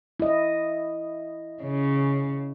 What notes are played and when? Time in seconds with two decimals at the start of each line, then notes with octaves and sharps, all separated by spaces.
0.20 E4 D#5
1.63 C#3